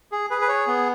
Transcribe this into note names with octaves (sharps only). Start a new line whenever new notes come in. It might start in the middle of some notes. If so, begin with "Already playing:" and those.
G#4
G#4 B4
B4
C#5
B3